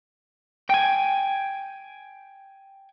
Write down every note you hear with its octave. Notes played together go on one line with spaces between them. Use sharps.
G5 G#5